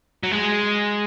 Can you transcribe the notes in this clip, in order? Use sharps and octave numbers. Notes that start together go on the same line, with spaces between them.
F#3
G#3